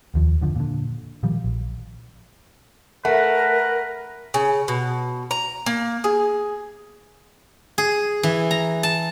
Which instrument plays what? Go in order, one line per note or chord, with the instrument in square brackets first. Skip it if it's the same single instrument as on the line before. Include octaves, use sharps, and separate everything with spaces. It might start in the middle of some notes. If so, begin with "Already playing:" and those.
[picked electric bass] F1 D#2 F3
F#1 D3 F3
A#2 D3
A#2 D#3 F3 G3
A#1
[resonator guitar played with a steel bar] A3 [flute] A#4 [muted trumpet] B4 [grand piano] F#5
[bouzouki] C#3
B2
A#5
A#3
G#4
[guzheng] G#4
E3
A#5
A5